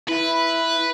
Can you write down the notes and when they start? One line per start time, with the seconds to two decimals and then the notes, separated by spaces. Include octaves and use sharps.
0.08 E4 B4